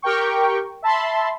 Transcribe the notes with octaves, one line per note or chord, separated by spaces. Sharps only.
G4 A#4 G5 C#6
E5 A5 B5 C6